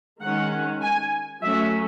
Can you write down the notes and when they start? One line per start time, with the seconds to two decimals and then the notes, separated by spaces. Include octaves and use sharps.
0.22 D#3 G#3 C#4 F#5
0.82 G#5
1.43 F#3 A3 C#4 E5